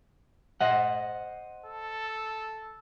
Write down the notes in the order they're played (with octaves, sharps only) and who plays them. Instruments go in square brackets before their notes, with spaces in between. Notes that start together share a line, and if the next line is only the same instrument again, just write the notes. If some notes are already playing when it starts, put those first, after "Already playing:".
[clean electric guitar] C5 D#5 F#5
[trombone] A4